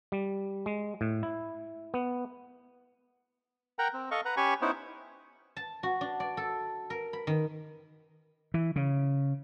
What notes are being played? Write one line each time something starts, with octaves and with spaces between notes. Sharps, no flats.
G3
G#3
A2
E4
B3
A#4 F#5 G5 A#5
C4
A4 D#5 F5 C#6
B4 F#5 A#5
C#4 G4 G#5 B5 C#6
B3 C#4 D#4 E4 C5
A5
F#4
D4
D5
A4
A#4
B5
D#3
E3
C#3